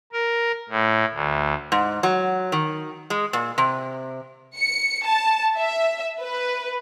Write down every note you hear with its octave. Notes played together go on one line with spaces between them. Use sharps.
A#4
A2
D2
G#2
F#3
D#3
G#3
A#2
C3
C#7
A5
E5
B4